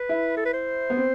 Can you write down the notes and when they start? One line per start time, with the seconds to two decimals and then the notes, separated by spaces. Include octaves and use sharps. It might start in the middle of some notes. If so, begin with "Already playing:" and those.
Already playing: B4
0.09 E4
0.37 A4
0.45 B4
0.53 C5
0.90 B3
0.97 C4